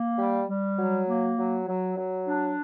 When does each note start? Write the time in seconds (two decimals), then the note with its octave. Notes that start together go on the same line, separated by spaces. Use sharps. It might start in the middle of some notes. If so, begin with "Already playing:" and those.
Already playing: A#3
0.17 G3
0.48 G3
0.78 F#3
1.07 A#3
1.37 F#3
1.67 F#3
1.96 F#3
2.27 D4